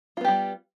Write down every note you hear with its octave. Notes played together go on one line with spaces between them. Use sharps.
G3 B3 F4 G4